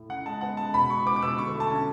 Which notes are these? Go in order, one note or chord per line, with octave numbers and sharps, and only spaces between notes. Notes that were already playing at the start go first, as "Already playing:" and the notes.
Already playing: A2
C#3 F#5
G#3 A5
B3 F#5
C#3 A5
B2 B5
G#3 C#6
B3 D6
D6
B2 E6
D3 C#6
A3
A5
C#4